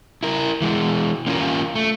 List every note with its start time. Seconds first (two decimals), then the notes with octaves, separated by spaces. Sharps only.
0.23 E4 A#4
0.62 E3 G#3
1.27 A#3 C#4 F4 A#4
1.75 A3